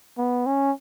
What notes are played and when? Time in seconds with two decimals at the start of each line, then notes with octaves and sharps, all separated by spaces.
0.18 B3
0.46 C#4